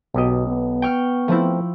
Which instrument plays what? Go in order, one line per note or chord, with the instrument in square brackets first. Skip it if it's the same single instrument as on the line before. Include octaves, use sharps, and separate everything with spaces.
[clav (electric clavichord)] B1 G4 D#5 [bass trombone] B2
[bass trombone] B3
[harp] G5 C#6 F6
[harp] F3 E4 [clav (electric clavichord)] A3 C4